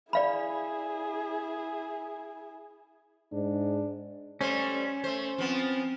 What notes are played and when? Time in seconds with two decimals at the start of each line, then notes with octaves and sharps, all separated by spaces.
0.13 E4 G#4 D5 F5 B5
3.32 G#2 D4
4.41 G3 A3 C#4 C5
5.04 A3 C5
5.38 F3 B3 C4